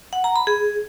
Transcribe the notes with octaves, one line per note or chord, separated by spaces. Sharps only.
F#5
A#5
B5
G#4